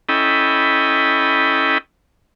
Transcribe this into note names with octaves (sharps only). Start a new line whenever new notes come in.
C#4 E4 A4 D#5 G5 B5